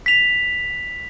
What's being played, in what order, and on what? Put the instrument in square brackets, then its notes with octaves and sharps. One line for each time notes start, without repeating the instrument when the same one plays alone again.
[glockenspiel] B6 F7